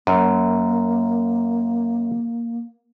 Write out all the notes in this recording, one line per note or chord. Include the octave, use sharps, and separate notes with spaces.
F#2 A#3